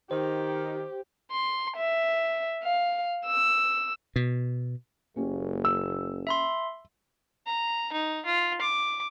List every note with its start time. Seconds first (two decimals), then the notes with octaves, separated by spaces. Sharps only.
0.11 D#3 D#4 G4 C5
1.30 C6
1.76 E5
2.62 F5
3.24 E6
4.16 B2
5.16 F#1 A#3 C#4 G4
5.65 E6
6.27 E5 B5 C6
7.46 A#5
7.93 D#4
8.26 F4
8.61 D6